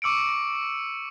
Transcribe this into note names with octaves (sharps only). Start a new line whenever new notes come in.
C#6 D6 E6 C#7 D7